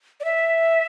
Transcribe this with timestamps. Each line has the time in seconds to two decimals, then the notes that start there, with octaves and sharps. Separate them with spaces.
0.20 D5
0.25 E5